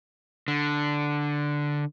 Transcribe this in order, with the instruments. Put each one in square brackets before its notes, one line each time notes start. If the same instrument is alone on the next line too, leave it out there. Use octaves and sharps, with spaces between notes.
[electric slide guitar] D3